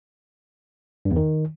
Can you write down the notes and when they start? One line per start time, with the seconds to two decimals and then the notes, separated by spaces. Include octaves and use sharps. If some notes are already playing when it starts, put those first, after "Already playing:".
1.05 G2
1.11 E2
1.16 D#3